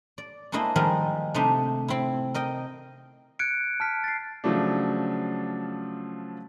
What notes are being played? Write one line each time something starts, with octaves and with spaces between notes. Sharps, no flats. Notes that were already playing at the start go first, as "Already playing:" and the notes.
D5
G#3 A#3 D4 E4 C5 D#5
D#3 F3 G3 G#3 A#4
C3 A3 D4 D#4 C5
C4 E4
A#4 D#5 G5
F#6 G#6 C#7 D7
A5 F6 B6
A6 C7
C#3 F3 F#3 A3 D4